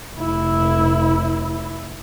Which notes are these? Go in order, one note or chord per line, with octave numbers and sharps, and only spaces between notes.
F1 E4